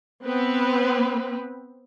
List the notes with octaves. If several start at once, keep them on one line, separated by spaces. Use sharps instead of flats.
B3 C4 B4